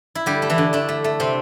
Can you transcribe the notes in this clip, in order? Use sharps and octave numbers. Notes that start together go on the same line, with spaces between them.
E4
D3 G3 G4
A3
E3 E4
D3
A3 D4
A3
A3
C3 C4